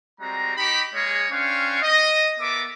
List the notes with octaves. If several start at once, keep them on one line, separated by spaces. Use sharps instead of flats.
G3 G#3 C4 F#4 A#5
D#4 G4 B5
G#3 A#3 G#4 C#5
C#4 D4 C5 F5 G5 C#6
D#5
B3 A4 A#4 E5 D6